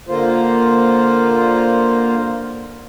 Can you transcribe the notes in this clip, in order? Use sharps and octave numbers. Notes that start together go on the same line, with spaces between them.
D3 A#3 F4 C5